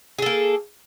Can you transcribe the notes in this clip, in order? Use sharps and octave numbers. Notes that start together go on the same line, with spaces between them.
A#3 G#4 A4